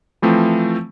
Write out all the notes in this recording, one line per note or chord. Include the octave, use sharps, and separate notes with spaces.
E3 F3 A3 C4